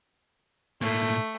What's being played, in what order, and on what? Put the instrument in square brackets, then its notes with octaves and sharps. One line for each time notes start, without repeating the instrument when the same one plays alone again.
[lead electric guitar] A2 A#3 [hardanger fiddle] A3